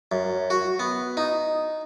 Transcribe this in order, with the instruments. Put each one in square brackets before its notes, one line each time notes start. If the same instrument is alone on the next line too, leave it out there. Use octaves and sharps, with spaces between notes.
[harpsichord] F#2
F#4
B3
D#4